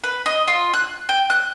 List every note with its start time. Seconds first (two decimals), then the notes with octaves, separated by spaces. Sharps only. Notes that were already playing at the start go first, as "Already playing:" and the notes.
0.04 B4
0.26 D#5
0.48 F4
0.74 F#6
1.09 G5
1.30 F#6